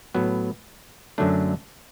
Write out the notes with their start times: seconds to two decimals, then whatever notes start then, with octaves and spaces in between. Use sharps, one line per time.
0.14 A2 F#3 B3
1.18 F#2 D3 F#3 A3 D4